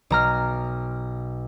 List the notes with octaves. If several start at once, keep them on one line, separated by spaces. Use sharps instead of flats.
B1 A#5 F6